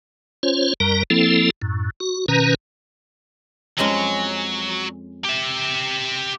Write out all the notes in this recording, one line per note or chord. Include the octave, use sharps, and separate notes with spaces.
C#4 F4 C5 C#5
F#2 G3 A#4 A#5
F3 A#3 C4 E4 A4
F#2 A2
F#4
B2 D#3 C#4 B4 A#5
F2 F#3 G#3 C#4
G4 E5